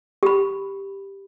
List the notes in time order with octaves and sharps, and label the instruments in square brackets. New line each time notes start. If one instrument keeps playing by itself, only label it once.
[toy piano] G4 B5